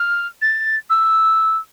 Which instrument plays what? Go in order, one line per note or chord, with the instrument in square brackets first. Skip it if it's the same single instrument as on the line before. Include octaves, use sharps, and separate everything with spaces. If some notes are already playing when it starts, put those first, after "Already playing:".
Already playing: [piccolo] F6
A6
E6